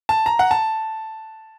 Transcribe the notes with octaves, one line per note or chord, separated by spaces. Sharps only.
A5
A#5
F#5
A5